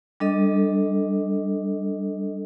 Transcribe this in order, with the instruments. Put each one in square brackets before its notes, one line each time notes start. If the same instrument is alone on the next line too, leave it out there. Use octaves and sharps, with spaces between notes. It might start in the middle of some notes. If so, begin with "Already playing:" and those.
[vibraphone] G3 D4 A4 D#5